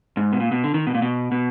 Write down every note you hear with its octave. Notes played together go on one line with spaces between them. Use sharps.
G#2
B2
A#2
B2
D3
D#3
B2
A#2
B2
B2